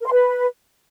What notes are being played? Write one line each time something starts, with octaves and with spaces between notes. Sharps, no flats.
A#4
C6
B4